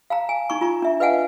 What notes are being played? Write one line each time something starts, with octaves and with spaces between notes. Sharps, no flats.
F5 A5 A#5
G#5
D#4 A#5 C#6
F4 A#5
D4 E5
B4 D#5 F5 F#5 G#5 A5